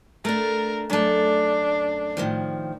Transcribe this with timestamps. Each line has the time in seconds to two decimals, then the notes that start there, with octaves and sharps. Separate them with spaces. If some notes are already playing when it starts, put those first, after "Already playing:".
0.25 A3 D4 A#4
0.90 F#2 A3 D4
2.17 A2 D#3 F3